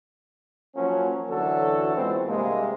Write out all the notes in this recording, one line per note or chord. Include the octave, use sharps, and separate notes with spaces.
F3 F#3 A#3 C#4
D2 D3 E3 F#3 F#4 A4
A#2 E3 G#3 B3 C4
G2 C3 G#3 A#3